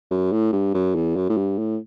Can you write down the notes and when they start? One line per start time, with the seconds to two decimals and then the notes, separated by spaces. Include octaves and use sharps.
0.11 F#2
0.32 A2
0.53 G2
0.74 F#2
0.95 E2
1.16 F#2
1.29 A2
1.37 G2
1.59 A2